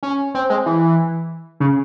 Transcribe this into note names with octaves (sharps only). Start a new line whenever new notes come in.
C#4
C4
G#3
E3
C#3